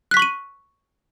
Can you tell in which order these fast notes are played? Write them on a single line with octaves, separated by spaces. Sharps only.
F#6 B6 C#6 F#7 D#7